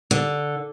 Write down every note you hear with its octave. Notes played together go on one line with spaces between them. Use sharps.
D3